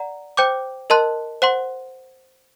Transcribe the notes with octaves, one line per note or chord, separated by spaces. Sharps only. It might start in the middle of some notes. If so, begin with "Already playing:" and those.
Already playing: D5 F#5 A#5
C5 G5 D6 G6
A#4 D#5 A5 C6 F#6
C5 F#5 C6